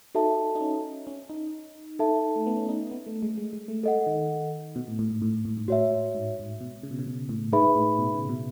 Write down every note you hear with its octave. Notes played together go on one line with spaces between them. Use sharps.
D#4 F#4 A4 E5 A5
D#4
C#4
C#4
D#4
D#4 A4 E5 A5
A3
B3
C#4
D#4
B3
A3
G#3
G#3
G#3
A3
G#3 A4 D#5 F#5
D#3
B2
A2
A2
G#2
A2
A2
G#2
A2 F#4 C#5 E5
G#2
G#2
B2
C#3
B2
C#3
B2
A2
G#2 D#4 G#4 B4 E5 B5
A2
B2
C#3
B2